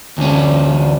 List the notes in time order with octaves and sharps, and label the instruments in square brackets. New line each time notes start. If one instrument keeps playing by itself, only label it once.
[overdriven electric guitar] D2 C#4